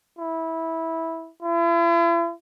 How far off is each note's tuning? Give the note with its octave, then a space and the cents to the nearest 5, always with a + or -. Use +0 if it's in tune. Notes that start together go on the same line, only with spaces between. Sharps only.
E4 -15
E4 +45